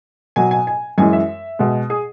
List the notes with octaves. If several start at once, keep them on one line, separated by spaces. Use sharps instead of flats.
B2 F#3 G#5
G#5
G#5
F#2 E3 G#3 G#5
E5
B2 G#3
G#4